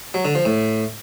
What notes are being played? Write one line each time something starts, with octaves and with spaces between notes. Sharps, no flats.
F#3
D3
F3
A2